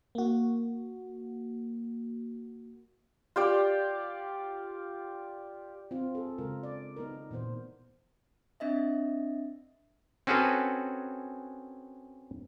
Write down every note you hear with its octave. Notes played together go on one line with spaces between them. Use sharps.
A#3 F#4
F4 G4 D5
C4 F4
G#4 A4
C#3 G#3 F4 A#4
D5
B3 D#4 A#4
A#2 E3 B3 C5
C4 D4 D#5 E5
C4 C#4 F#4 G#4 A4 B4